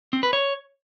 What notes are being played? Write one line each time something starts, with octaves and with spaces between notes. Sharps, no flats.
C4
B4
C#5